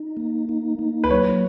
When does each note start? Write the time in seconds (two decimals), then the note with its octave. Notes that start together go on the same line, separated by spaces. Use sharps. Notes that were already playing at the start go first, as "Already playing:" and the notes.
Already playing: D#4
0.17 A#3
0.49 D#4
0.79 A#3
1.04 B4
1.10 F#3 C#5